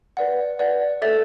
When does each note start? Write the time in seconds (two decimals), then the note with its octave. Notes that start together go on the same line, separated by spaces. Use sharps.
0.17 B4 D5 F#5
0.59 B4 D5 F#5
1.02 A4 C#5 E5 A6